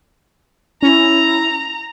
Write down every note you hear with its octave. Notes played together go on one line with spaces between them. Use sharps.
C#4 E4 A#5